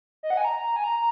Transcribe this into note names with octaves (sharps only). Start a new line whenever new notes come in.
D#5
F#5
G#5
A#5
G#5
A#5